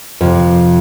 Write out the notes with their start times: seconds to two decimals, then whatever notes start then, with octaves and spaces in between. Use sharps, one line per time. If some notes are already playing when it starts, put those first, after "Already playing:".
0.21 F2 C3